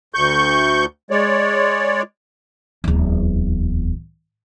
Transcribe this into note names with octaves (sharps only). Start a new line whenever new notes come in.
D2 C#6 G6
G#3 C#5 D5
D1 E2